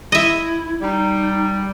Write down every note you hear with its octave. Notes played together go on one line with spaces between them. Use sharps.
E4 D#5 E5
G3 D#4